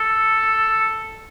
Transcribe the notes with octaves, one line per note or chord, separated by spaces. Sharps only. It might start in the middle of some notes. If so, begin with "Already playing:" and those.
Already playing: A4